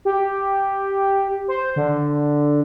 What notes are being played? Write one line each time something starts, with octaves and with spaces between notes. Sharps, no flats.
G4
C5
D3